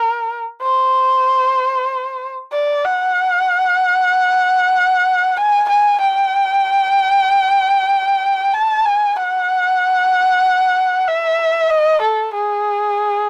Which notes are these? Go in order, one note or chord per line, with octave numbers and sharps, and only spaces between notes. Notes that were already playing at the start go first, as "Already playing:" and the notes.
Already playing: A#4
C5
D5
F#5
G#5
G#5
G5
A5
G#5
F#5
E5
D#5
A4
G#4